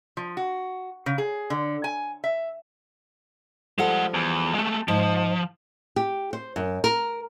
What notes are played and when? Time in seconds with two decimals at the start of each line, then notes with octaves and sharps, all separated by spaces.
0.17 F3
0.37 F#4
1.06 C#3
1.18 G#4
1.50 D3
1.84 G#5
2.24 E5
3.78 F3 G3 G#3 A4 F#5
4.14 E2
4.55 G#3 A3
4.88 G#2 F3
5.96 G4
6.33 C5
6.56 F#2
6.84 A#4